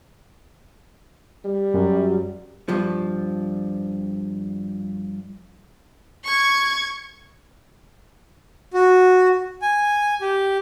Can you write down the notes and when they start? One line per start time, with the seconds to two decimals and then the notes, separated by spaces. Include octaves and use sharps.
1.45 G3
1.74 F#2
2.69 G2 F3
6.25 C#6 G#6
8.74 F#4
9.62 G#5
10.21 G4